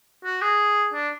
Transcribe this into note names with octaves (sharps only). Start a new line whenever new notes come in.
F#4
G#4
D4